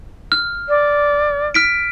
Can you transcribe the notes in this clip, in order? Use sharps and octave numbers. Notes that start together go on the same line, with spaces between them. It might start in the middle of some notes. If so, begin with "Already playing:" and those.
F6
D5
F6 B6 D7